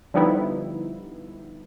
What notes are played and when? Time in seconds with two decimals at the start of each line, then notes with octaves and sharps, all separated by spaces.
0.14 D3 F3 G3 B3 D#4 E4